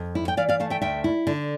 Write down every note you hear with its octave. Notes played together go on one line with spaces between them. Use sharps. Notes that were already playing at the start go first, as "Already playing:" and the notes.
Already playing: F2
E4
G5
E3 D5 F5
D5 F5
A3 F5 A5
E5 G5
D2 E5 G5
E4
D3